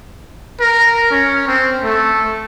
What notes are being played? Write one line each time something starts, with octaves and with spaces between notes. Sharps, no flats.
A#4
C#4
C4
A3